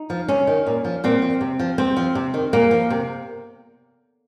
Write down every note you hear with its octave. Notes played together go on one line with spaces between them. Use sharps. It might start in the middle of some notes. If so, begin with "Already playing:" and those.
Already playing: D#4
F3
C3 C#4
D#3
A#2
F3
A#2 C4
F3
C3
F3
C3 C4
F3
C3
D#3
A#2 A#3
F3
C3